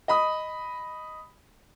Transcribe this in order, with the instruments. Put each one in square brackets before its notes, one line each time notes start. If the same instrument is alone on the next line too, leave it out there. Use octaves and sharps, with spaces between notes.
[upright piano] D#5 B5 D#6